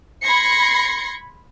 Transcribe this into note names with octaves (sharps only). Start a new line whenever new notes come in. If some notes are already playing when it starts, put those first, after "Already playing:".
B5 C6 G#6 A#6 C7 C#7